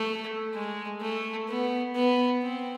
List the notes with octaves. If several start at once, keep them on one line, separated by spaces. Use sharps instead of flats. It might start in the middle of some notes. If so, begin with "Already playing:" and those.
Already playing: A3
G#3
A3
B3
B3
C4